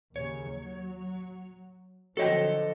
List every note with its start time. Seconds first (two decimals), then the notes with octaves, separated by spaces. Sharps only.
0.16 D#2 C#3 C#5
0.54 F#3
2.17 D3 F3 F#3 F#4 A4 C#5 D#5 G5